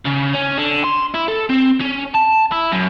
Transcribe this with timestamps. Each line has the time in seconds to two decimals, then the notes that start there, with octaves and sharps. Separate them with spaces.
0.05 C#3
0.34 C#4
0.57 D3
0.84 C6
1.14 E4
1.28 A4
1.50 C4
1.81 C#4
2.15 A5
2.52 E4
2.72 F#2